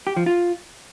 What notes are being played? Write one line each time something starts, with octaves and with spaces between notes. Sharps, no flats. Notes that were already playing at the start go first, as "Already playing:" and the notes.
G4
F3
F4